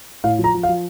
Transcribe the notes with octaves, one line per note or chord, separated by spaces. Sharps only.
A2 F5
F3
A#5
F3
F5
F3